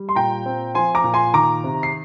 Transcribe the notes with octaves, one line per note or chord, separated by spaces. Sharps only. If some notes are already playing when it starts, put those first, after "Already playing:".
Already playing: G3
C6
A#2 G5 A#5
C4
F3 G#5 C6
A#5 D6
A#2
G#5 C6
D#3 A#5 D6
C3
C7